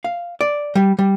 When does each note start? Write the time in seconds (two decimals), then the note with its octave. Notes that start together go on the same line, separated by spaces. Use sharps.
0.04 F5
0.41 D5
0.75 G3
0.99 G3